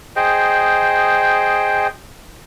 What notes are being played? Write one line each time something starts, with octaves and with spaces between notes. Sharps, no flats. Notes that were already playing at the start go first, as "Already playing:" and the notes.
G#4 C5 D#5 G5